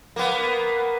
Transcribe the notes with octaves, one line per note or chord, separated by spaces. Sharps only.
A#3 B3